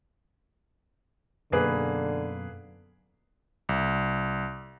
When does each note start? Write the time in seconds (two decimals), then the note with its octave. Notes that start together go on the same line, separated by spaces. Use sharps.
1.52 F#2 B2 D3 A#3 G#4 B4
3.69 C2